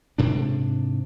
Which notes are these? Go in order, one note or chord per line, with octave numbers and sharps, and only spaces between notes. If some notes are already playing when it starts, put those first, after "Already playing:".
G#2 C3 D4